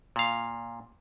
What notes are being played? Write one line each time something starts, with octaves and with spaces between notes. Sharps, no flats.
A#2 F5